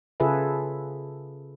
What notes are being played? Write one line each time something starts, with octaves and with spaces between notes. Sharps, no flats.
C#3 F4 G#4 A4 B4 E5